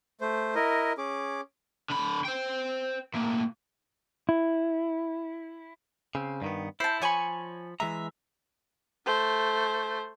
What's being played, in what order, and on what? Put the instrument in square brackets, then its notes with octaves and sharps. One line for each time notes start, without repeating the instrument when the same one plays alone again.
[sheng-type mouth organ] A3 C5
E4 A#4 D#5
C#4 G#4 D6
[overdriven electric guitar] D3 B5
C5 G5
A2 A#3
[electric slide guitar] E4
[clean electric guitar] C#3 C4
G2 D#3 B3
[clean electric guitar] E4 [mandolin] C5 A5
[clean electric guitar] F3 B5 [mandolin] C#5 G#5 C#6
[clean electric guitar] E3 G#3 A#5 [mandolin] E5
[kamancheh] A3 C5